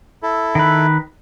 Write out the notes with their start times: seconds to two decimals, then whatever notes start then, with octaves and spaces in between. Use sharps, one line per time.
0.23 E4 A4
0.55 D#3 B4